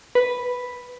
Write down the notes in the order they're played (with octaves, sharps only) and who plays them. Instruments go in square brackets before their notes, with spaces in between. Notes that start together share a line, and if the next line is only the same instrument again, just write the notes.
[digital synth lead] B4